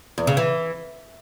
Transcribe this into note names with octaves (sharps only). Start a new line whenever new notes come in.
E2
C#3
E3